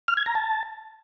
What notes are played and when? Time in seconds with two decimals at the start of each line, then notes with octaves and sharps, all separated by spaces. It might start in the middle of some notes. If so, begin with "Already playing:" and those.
0.08 F6
0.17 G#6
0.26 A#5
0.35 A5